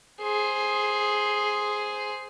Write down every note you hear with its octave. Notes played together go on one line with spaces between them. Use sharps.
G#4 C5